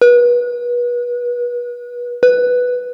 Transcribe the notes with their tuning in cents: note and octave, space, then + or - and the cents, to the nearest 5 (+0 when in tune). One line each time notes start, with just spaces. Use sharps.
B4 -30
B4 +0